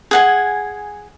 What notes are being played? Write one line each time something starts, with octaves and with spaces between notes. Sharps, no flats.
G#4 F#5 G#5